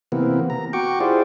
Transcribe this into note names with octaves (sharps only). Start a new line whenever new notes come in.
C3 E3 A#3 B3
A#5
F#4 G5 C#6 D6
E4 F4 G4 G#4 C5 D5